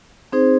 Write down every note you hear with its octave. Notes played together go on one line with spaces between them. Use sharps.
C4 D#4 G#4 C5